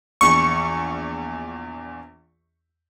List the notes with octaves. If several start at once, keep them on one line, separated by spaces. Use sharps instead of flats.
A#1 E2 C#6